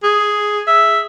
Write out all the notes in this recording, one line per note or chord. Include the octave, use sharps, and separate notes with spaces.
G#4
E5